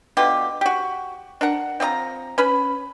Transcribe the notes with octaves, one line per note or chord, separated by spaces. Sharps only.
B2 D3 F4 G4
F#4 G4
D4 A#4 F#5
C4 F4 D#5 A#5
C#4 B4 B5